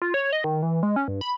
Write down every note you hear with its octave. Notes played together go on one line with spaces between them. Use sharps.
F4
C#5
D#5
D#3
E3
G#3
C#4
G2
B5